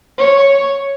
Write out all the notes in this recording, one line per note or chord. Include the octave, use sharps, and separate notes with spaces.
C#5